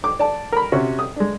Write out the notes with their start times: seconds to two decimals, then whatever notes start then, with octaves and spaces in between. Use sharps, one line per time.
0.04 D6
0.19 D5 A5
0.52 A#4 B5
0.72 C3 C#4 F#4
0.99 D#6
1.16 G#3 D4